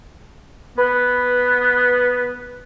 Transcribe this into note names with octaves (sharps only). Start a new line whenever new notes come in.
B3 B4